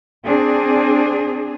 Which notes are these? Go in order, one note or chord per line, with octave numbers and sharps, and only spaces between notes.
C4 D4 G#4